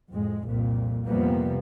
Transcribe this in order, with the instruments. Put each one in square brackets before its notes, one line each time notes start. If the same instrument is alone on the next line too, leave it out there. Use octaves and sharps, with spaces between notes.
[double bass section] F2 A2 G#3
C2 F2 A#2
F2 C3 F3 G3 A#3 B3